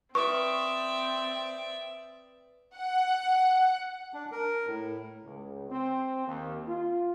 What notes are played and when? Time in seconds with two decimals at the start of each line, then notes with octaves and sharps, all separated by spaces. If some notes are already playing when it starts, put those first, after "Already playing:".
0.15 C4 B4 D5 E5 C#6 D#6
2.76 F#5
4.13 D4
4.32 A#4
4.67 A2
5.23 C#2
5.69 C4
6.26 D#2
6.66 F4